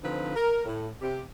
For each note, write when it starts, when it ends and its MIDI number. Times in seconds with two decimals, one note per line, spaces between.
0.03 0.33 50
0.03 0.33 53
0.03 0.33 60
0.03 0.33 63
0.03 0.33 65
0.03 0.33 71
0.35 0.62 70
0.65 0.89 45
1.01 1.22 48
1.01 1.22 67